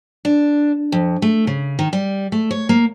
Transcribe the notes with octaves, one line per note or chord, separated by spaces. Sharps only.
D4
F2
A3
C#3
D#3
G3
A3
C#5
A#3